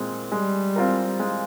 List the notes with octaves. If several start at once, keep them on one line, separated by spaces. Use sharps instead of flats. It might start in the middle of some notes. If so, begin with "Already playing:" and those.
Already playing: A#2 G#3 C4
G3 G#3
C4 F4 A#4
G#3